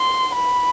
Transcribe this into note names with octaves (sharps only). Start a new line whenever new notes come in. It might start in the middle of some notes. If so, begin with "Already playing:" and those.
Already playing: C6
B5